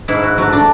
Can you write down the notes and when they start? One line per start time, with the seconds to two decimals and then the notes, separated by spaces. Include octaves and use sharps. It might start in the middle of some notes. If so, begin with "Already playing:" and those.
0.08 G#2 E4
0.23 F#4
0.38 F#3 A3 F#4
0.53 D4